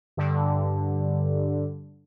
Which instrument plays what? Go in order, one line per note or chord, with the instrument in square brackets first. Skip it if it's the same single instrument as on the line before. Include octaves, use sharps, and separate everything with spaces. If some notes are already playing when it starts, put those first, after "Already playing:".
[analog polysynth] G2 D3